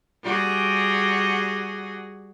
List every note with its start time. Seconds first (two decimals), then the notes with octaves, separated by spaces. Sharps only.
0.23 G3 F#4 G#4